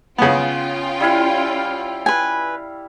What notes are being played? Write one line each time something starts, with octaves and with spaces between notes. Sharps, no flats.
C#3 B3 C#4 F4 G5
G3 E4 F5
B4 G#5